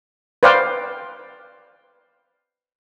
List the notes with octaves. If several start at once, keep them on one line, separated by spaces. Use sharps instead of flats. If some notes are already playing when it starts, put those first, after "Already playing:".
B4 C5 D5 F5 G5